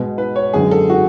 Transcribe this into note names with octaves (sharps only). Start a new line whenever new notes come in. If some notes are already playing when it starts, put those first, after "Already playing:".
Already playing: B2 G#3 B3
B4
C#5
F#2 D3 G#3 B3 G#4
A4
F#4